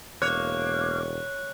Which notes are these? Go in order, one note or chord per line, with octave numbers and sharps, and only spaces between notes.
E1 A#3 C#5 F#6